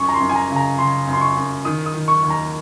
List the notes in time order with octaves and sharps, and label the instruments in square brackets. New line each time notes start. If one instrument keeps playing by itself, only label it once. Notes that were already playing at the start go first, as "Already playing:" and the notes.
Already playing: [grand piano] F#2 C#6
A#5
C6
F#2
G#5
A#5
C#3
A#5
C#3 C6
F#2
C6
C#6
F#2
D#3 D#6
D#6
D#3
C#6
D#2
A#5